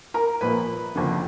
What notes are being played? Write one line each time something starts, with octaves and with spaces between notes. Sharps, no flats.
A#4 A#5
A#1 A#2 F3 A#3 B4 B5
F#1 F2 D3 F3